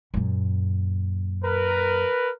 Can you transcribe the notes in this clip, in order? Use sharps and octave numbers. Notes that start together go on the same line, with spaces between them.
F#2 A#2
A#4 B4